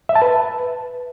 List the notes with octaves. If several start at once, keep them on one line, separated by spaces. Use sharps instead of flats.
E5
A5
B4